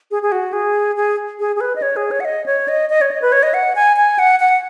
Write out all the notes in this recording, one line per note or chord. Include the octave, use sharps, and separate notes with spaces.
G#4
G#4
F#4
G#4
G#4
G#4
G#4
B4
D#5
C#5
G#4
C#5
F#5
D#5
C#5
D#5
D#5
C#5
D#5
B4
C#5
D#5
F#5
G#5
G#5
F#5
F#5